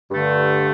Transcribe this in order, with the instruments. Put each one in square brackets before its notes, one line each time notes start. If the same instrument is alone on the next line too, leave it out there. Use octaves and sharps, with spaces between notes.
[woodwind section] G2 D3 A3